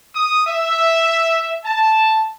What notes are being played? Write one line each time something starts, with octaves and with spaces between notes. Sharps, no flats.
D#6
E5
A5